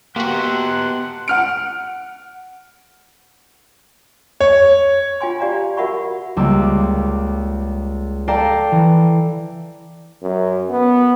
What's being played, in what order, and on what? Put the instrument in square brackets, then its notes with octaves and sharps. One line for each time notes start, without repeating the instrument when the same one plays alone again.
[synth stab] A#3 F#4 [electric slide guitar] B3 G4 [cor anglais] F#5 [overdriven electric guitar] C6
[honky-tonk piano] F#5 F6 D7
[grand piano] C#5
[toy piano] F4 G5 G#5 C6
F4 G4 D5 F5 A#5
F#4 A#4 E5 F#5 B5 C#6
[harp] C#2 G3 A#3 D6 E6
A4 D5 F5 G5 A5 A#5
E3
[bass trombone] F#2
B3